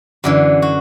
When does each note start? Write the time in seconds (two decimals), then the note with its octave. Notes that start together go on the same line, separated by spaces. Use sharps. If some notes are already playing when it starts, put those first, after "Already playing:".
0.24 F#2 D3 E3
0.62 F#4